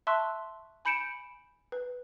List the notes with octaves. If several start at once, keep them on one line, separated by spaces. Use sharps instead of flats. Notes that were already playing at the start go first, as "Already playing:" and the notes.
E5 A5 C6 C#6 E6 F#6
G#5 B5 G6 C#7 D7 E7
B4